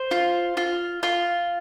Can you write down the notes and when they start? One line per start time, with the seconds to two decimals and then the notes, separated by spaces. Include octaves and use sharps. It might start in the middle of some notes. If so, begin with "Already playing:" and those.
Already playing: C5
0.11 F4
0.57 F4
1.03 F4